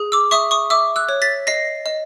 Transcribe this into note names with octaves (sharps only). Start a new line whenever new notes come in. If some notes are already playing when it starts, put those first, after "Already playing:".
Already playing: G#4
D6 E6
E5 C#6 D#6
C#6 D#6
E5 D6 E6
E6 F#6
C#5
A6 B6
D#5 A#6 C7
D#5